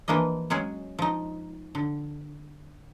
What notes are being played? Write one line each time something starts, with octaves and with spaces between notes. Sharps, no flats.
E3 F3 A#3 D4 D#5
F#3 G#3 C#4 G#4
F3 D#4
D3